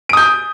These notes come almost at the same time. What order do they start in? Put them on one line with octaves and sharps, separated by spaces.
D7 D#6 G6